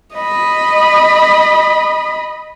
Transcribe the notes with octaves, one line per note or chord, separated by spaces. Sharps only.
D#5 B5